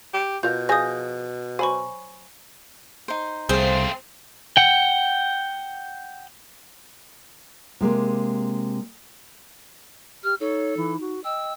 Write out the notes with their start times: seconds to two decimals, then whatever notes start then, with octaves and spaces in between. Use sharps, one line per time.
0.13 G4
0.43 B2 F4 A#4 G6
0.69 F3 G#4 G#5 D#6 G6 A#6
1.59 F#3 C5 G#5 B5 C#6
3.08 D#4 C5
3.49 C2 A3 C4 G#4 C5 F5
4.57 F#5 G5
7.81 C3 G#3 A#3
10.24 G4 F6
10.40 D#4 A4 C#5
10.77 E3
11.01 F#4
11.24 D#5 G5 E6